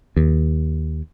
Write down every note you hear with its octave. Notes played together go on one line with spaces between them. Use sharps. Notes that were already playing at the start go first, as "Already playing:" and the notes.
D#2